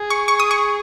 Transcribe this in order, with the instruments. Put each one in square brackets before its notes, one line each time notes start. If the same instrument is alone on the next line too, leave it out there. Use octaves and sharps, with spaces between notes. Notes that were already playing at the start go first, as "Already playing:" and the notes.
Already playing: [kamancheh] G#4
[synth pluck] C#6
C#6
D#6
C#6